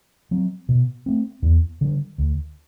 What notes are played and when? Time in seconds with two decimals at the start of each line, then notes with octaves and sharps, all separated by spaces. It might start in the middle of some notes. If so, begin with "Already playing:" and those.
0.31 F#3 C4
0.69 B2
1.06 A3 C4
1.42 E2
1.81 D3 G3
2.18 D2